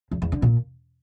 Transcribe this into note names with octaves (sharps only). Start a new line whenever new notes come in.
E2
E2
D3
A#2